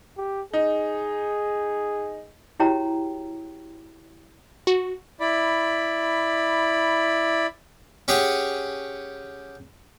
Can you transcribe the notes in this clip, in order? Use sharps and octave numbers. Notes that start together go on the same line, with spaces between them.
G4
D#4 G#4
E4 F#4 G4 C#5 G5 A#5
F#4
E4 D5 B5
C#4 G4 G#4 C#5 F#5 C#6